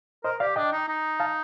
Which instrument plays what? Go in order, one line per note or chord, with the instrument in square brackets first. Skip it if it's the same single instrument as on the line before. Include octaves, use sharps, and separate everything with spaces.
[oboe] A#4 [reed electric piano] C5 D#5
[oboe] G4 [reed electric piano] D5 F5
[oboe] D4 [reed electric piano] D#5 G5
[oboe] D#4
D#4
[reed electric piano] F5 A5